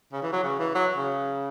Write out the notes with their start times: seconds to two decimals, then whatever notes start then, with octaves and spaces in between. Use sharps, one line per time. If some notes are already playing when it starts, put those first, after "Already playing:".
0.12 C#3
0.22 E3
0.32 F#3
0.43 C#3
0.59 E3
0.75 F#3
0.96 C#3